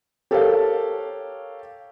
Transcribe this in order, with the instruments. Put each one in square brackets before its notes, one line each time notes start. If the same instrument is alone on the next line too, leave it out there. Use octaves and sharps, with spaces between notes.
[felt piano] G4 A4 A#4 C#5 F5